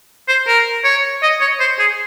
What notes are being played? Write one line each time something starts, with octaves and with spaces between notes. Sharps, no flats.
C5
A#4
C#5
D#5
C#5
C5
G#4